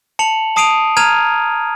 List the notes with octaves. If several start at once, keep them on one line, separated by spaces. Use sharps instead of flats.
A5 C#7 F7 F#7
A5 D#6 C7 D7 D#7 F7
A#5 F6 G#6 D#7 F7